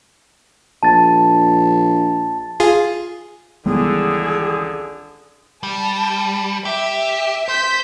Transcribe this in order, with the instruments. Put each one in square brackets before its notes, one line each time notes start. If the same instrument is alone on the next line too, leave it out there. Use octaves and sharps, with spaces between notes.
[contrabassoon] A#1 [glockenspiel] A5 A6
[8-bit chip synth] F4 G#4
[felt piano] G#1 C#2 E3 [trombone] D3 [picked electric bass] G3 B3 [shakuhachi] G#4
[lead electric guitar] G3 [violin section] A5
[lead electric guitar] G4 [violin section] E5
[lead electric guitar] C5 [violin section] G6 B6